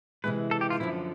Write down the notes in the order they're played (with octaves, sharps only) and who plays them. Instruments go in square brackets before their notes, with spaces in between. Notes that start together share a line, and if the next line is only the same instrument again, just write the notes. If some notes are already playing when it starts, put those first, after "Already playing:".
[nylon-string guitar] C3 E3 G#3 [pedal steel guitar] B4
[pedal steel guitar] A4
G4
F4
[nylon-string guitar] F#2 D3 F3 [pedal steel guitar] E4